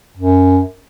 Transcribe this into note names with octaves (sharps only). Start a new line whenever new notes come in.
F#2